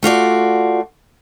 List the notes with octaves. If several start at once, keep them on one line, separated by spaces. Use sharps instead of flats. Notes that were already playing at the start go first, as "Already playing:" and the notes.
A3 F4 F#4 D5